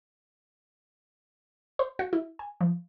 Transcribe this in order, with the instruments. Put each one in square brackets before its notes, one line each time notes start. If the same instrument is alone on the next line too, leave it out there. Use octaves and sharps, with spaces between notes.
[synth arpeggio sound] C5
F#4
E4
G#5
F3